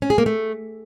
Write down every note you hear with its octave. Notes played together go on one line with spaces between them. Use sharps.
C#4
G#4
A#3
A3